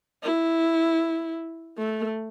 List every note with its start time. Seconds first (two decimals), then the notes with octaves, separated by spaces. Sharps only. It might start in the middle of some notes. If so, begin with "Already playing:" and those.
0.23 E4
1.78 A3